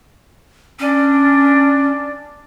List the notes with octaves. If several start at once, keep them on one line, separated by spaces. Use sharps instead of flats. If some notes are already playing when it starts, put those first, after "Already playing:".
C#4 D4